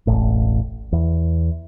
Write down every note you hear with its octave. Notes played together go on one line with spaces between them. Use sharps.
E1 A1 A2
E2